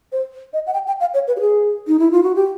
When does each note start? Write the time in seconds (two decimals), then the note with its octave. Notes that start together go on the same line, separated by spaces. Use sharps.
0.12 C5
0.53 D#5
0.67 F#5
0.74 G5
0.87 G5
1.00 F5
1.14 C#5
1.28 B4
1.37 G4
1.41 G#4
1.87 D#4
1.99 E4
2.12 F4
2.23 F#4
2.35 G4